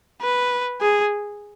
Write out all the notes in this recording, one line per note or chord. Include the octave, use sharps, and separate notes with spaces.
B4
G#4